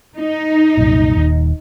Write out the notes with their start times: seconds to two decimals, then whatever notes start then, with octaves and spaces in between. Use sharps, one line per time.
0.17 D#4
0.77 C2 F#2 A#2
1.17 D#1 D#2